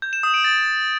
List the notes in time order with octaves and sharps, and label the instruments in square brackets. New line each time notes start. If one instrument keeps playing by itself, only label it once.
[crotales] G6
E7
D#6
D7
A6